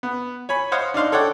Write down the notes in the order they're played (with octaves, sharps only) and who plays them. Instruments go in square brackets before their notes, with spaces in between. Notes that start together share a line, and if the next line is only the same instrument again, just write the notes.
[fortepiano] B3
C#5 G#5 B5
C5 C#5 D#5 F5 F#5
D4 D#4 F5 C6
A4 C#5 D5 F#5 G5